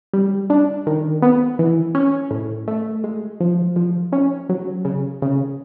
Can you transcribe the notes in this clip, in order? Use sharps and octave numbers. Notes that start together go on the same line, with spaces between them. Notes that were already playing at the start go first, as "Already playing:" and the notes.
G3
D4
D#3
B3
E3
C#4
A2
A3
G#3
F3
F3
C#4
F#3
C#3
C#3